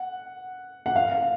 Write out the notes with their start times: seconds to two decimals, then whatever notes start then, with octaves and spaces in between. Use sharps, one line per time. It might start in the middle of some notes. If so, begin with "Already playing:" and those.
Already playing: F#5
0.86 F#5
0.96 F5